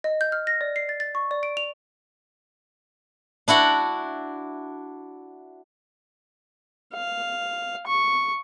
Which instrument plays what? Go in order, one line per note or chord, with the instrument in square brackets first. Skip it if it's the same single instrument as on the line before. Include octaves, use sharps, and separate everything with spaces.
[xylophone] D#5
G6
F6
A#6
D5
C7
A6
A6
C#6
D5
D7
F7
[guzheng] D4 E4 F#4 F#5
[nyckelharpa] F5
C#6